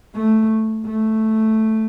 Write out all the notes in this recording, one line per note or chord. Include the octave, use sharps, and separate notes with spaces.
A3
A3